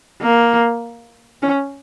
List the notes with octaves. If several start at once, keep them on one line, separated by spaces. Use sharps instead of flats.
A#3
C#4